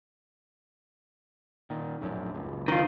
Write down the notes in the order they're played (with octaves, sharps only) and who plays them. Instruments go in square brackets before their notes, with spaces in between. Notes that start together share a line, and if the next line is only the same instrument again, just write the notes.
[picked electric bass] A#2 D#3
D1 A#1 F#2
F#1 C#2
[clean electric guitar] D#3 F4